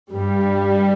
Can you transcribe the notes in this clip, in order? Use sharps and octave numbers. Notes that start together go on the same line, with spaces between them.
G2 G3